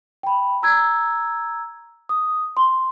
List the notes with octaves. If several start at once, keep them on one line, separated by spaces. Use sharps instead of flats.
G5 B5
A#5 E6 G#6
D#6
C6